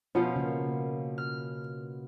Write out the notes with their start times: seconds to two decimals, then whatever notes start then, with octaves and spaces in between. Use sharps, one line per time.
0.15 B2 F3 C#4 F4
0.36 C#3 A#3
1.18 F6